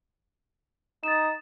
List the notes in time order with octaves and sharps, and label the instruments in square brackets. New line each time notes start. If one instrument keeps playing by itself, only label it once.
[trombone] D#4 [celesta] A6 E7